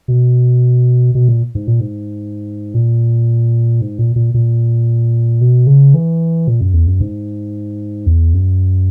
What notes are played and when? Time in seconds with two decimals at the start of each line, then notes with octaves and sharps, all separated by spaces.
0.08 B2
1.15 B2
1.29 A#2
1.55 G#2
1.67 A#2
1.81 G#2
2.74 A#2
3.81 G#2
3.99 A#2
4.16 A#2
4.34 A#2
5.41 B2
5.67 C#3
5.94 E3
6.48 A#2
6.61 F#2
6.73 E2
6.87 F#2
7.00 G#2
8.06 E2
8.34 F#2